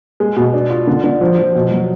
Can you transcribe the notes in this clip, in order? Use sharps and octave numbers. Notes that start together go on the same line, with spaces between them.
G#3
B2
D4
F4
D3
D3
F3
F3
B2
F#3